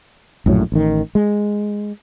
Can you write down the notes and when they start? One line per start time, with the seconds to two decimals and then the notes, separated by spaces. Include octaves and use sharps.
0.46 A#1 F#2 A2 F#3
0.72 A1 D#3
1.15 G#3